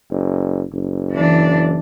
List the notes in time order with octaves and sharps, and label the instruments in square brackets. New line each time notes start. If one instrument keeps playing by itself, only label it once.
[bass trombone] F#1
F#1
[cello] E3 D4